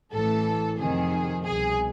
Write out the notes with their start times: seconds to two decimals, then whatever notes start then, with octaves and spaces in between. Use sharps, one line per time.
0.12 A1 A2 E3 A4
0.78 F2 C3 D#3 G#4
1.44 C2 B2 G#4